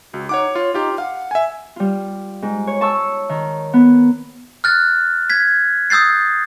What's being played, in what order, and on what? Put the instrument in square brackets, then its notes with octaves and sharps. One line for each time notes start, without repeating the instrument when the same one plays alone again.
[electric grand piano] C#2 [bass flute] F#4
[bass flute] D#4 [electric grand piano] C#5 F#5 D6
[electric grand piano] F4 [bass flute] C#5
[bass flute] D#4 [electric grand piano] F4 G4
[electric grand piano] F5 [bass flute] F#5
[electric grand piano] E5 G#5
[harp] G3 F4
G#2
C#5
A5 C#6 E6
D#3
B3
[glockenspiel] F6 F#6 A6
G#6 B6
D#6 E6 G6 A6 C7